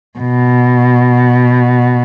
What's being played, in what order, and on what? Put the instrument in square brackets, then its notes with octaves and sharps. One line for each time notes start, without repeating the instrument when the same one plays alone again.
[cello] B2